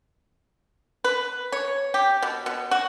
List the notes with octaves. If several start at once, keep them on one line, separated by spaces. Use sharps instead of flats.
B4
C#5
G4
B2
B2
F#4